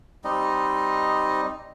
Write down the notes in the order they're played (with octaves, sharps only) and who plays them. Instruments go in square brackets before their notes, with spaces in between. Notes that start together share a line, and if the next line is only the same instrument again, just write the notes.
[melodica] G3 C4 D#4 D#5